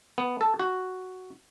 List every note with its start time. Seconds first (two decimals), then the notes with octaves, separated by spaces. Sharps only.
0.18 B3
0.41 A4
0.60 F#4